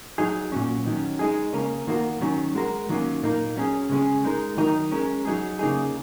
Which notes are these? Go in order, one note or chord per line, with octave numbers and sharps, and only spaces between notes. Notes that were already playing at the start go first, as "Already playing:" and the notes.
F#3 D#4 G#4
A#2 F#3 C#4
D#3 F#3 C#4
G#3 D#4 G#4
C#3 A#3 C#4 A#4
D#3 A#3 F#4 A#4
D#3 F#3 C#4
G#3 F#4 A#4
D#3 F#3 A#3 C#4
A#2 A#3 D#4 A#4
F#3 C#4 G#4
C#3 G#3 C#4 G#4
G#3 D#4 A#4
D#3 F#3 D#4 A#4
G#3 C#4 A#4
F#3 D#4 G#4
C#3 A#3 D#4 G#4